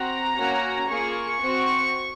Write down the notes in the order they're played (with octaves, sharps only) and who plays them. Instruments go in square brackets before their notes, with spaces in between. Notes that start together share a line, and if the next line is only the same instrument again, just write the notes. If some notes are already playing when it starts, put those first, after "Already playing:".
Already playing: [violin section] C4 F#4 A#5
A#3 C#4 F#4
A#3 F4 G#4 C#6
C4 F#4